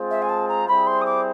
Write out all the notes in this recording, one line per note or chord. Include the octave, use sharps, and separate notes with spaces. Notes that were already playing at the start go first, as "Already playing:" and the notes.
Already playing: G#3 C4 F4 G#4 C5
E5
G#5
A5
A#5
G3 C4 E4 G#4 C5 B5
C6
D#6
D6